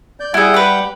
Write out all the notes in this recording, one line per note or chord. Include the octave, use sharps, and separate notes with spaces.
D5 G6
G3 E4 G#4 F#5 G6
G4 B4